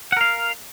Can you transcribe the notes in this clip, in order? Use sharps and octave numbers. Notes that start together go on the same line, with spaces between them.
A#4 F5 F#5